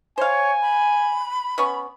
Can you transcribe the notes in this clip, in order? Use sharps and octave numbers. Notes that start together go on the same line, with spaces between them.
C5 C#5 F5 G#5
B5
B3 C#4 C#6